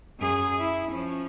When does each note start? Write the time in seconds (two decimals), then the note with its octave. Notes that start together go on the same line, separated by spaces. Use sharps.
0.20 F#2 G#4
0.59 E4
0.92 F3 C#4